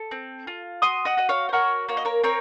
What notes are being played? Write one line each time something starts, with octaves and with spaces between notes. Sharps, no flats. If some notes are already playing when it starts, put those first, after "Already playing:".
Already playing: A4
C4
F4
F#4 C6 D#6
D#5 F#5
F#4 D#5
C#5 F5
C5
F#4 A#4 C#5
A#3 C#5
D#5
A#4 C#5
C4 A#4 C#5